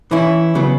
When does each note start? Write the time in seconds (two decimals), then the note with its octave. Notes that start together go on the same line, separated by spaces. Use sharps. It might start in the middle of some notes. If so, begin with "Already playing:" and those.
0.11 E3 C#4 E4
0.55 C#3 F#3 B3